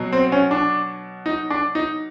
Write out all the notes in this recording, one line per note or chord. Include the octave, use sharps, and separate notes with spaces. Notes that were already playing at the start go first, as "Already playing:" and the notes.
Already playing: B2 F#3
C4
C#4
D4
D#4
D4
D#4